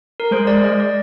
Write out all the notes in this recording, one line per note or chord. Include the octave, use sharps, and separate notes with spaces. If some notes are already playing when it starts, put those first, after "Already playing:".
A#4
G#3 C5
D5
D#5
D5